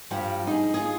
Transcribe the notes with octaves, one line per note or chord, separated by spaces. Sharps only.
G2 F3 G3 G4 F#5
D#4 G#4
F4 G#4